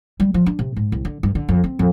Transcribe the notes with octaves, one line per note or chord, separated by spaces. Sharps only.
G3
F3
D4
C3
G#2
C2
D3
G2
D3
F2
C4
F2